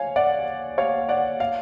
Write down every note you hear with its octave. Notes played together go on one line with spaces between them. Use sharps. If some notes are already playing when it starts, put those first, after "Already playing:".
Already playing: C#5 F5 G#5
D5 F#5
C#5 F5
D5 F#5
F5